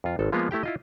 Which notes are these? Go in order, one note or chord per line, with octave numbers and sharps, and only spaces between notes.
F2 F4
G#1 A4
F3 G#3 A#3 B3 F4
A3 E4 G4 G5
E4 F4 D#5